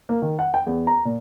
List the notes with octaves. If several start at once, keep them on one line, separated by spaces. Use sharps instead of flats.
A#3
D#3
F#5
G5
E2
A#5
A#2